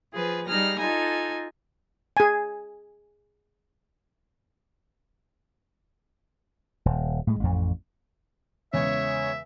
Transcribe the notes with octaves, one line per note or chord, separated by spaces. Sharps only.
F3 G#4 B4
G3 D#4 G#4 F6 A#6
D#4 F4 A4 G#5
G#4 G#5
D#1
A2 G#3
A1 F2
E2 C#3 G#3 C#5 E5